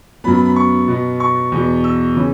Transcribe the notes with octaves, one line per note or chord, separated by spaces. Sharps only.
F#2 F#3 B3 B5
B5
B5
C#6
B2 B3
C#6
E2 B2 B3
E6
C#3 E3 C#4